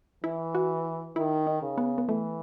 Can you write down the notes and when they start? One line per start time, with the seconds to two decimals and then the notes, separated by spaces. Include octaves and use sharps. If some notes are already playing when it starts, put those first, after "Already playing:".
0.24 E3 E4
0.55 F#4
1.16 D#3 E4
1.47 D#4
1.62 C#3
1.78 B3
1.98 B3
2.08 E3 A3